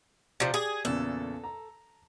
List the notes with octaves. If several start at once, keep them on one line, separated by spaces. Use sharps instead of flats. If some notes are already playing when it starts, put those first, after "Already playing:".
C3 F3 G4 D5
G#4
E2 A#2 C#3 A4
A#5